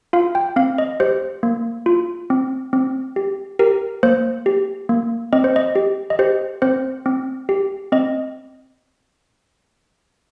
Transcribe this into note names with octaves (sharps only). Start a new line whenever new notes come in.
F4 F5
G5
C4 F5
D#5
G4 C5
A#3
F4
C4
C4
G4
G4 A#4
A#3 C5
G4
A#3
C4 D#5
C5
D#5
G4
D#5
G4 C5
C4 C5
C4
G4
C4 D#5